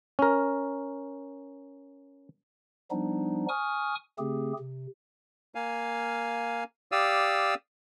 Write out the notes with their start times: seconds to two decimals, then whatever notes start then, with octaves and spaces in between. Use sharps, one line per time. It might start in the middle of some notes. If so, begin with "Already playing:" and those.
0.19 C#4 A#4
2.91 F3 G3 B3 D4 D#4
3.49 G#5 C#6 D#6 F6
4.19 C#3 A3 C4 G4 G#4
4.59 C3
5.55 A#3 F5 G#5
6.92 G4 D5 F5 D#6 E6